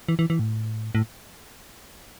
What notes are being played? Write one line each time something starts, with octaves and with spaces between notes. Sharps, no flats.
E3
E3
E3
A2
A2